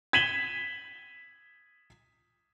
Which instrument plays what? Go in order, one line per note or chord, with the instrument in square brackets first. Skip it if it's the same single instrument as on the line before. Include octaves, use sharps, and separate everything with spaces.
[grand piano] G#6 B6 D#7 E7 F#7 G7